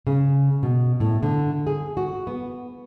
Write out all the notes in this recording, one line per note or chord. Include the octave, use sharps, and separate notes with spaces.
C#3
B2
A2
D3
G#4
F#4
B3